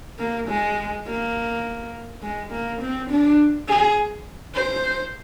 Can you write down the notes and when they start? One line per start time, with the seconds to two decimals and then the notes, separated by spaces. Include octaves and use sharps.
0.19 A#3
0.48 G#3
1.07 A#3
2.22 G#3
2.51 A#3
2.81 C4
3.10 D4
3.68 G#4
4.55 C5